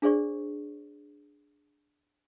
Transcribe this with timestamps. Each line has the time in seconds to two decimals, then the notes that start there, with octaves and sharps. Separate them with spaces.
0.02 D4 G#4 C5 D5 C#6